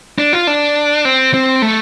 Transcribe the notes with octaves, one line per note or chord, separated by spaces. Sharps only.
D4
F4
D4
C4
C4
A3